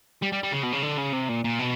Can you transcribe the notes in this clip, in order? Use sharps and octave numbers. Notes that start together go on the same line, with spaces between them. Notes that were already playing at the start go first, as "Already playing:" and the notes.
G3
G3
G3
C#3
B2
C#3
D3
C#3
C3
A#2
A#2
B2